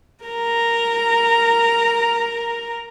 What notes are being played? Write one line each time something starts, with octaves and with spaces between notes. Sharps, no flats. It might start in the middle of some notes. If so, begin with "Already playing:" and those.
A#4 A#5